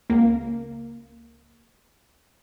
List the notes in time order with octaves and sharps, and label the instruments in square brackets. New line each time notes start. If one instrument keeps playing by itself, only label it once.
[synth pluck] C#2 A#3